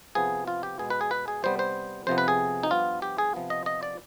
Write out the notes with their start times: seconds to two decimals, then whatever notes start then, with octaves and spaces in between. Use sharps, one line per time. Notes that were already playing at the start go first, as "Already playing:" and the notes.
0.15 C3 F3 B3 G#4
0.48 F4
0.63 G4
0.79 B2 G#3 B3 G#4
0.90 B4
1.01 G#4
1.11 B4
1.28 G#4
1.43 C3 G3 B3 C5
1.59 C5
2.07 F2 C3 F3 B3 C5
2.18 B4
2.28 G#4
2.63 D#4
2.71 G2 F3 B3 F4
3.02 G4
3.18 G#4
3.34 C3 F3 B3
3.50 D#5
3.66 D#5
3.83 D5